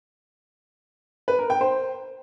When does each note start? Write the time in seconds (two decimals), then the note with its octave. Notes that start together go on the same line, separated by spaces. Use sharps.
1.28 B4
1.39 A#4
1.50 G5
1.61 C5